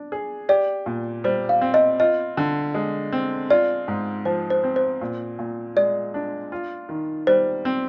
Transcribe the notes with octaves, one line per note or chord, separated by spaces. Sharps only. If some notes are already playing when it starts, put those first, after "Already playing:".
Already playing: D4
G#4
G4 D5
A#2
G3 C5
F5
C4
D#5
F4 D#5
D3
G#3
C4
F4 D5
G#2
F3 C5
C5
C4
C5
A#2
A#2
G#3 D5
D4
F4
D#3
G3 C5
C4